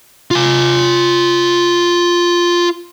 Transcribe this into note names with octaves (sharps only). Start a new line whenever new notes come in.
F4 G#5